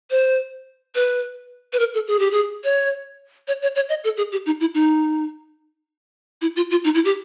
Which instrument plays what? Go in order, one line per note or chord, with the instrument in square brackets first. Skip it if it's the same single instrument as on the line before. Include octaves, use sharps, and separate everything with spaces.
[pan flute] C5
B4
B4
A#4
A4
G#4
G4
G#4
C#5
C#5
C#5
C#5
D#5
A4
G#4
G4
D#4
E4
D#4
E4
F4
F4
D#4
E4
G4